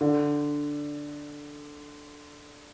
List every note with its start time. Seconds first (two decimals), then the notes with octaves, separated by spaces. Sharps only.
0.01 D3